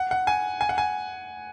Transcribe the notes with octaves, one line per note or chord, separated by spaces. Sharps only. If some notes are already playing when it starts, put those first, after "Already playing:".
Already playing: F#5
F#5
G#5
G#5
F#5
G#5